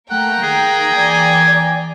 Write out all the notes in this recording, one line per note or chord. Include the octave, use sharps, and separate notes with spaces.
A3 A#3 F#5 G5 A#5
D#3 G#4
E3 D5 G#5